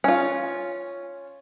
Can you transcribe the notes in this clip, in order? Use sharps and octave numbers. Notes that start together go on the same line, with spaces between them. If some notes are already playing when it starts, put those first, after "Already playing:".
C#4 F4